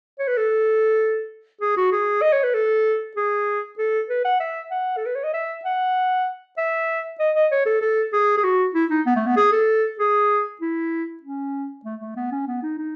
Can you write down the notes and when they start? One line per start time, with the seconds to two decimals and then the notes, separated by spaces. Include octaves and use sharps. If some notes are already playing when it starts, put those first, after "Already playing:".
0.19 C#5
0.28 B4
0.37 A4
1.61 G#4
1.77 F#4
1.92 G#4
2.22 D#5
2.33 C#5
2.43 B4
2.54 A4
3.17 G#4
3.78 A4
4.09 B4
4.25 F#5
4.40 E5
4.71 F#5
4.97 A4
5.06 B4
5.15 C#5
5.24 D#5
5.34 E5
5.65 F#5
6.57 E5
7.19 D#5
7.35 D#5
7.51 C#5
7.66 A4
7.82 A4
8.13 G#4
8.37 G#4
8.44 F#4
8.74 E4
8.90 D#4
9.06 B3
9.16 A3
9.27 B3
9.37 G#4
9.52 A4
9.99 G#4
10.61 E4
11.23 C#4
11.85 A3
12.01 A3
12.16 B3
12.32 C#4
12.47 B3
12.63 D#4
12.78 D#4